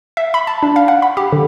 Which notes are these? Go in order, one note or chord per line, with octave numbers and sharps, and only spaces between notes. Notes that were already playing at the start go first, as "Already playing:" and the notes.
E5
B5
A5
D4
F5
F#5
B5
G4
D3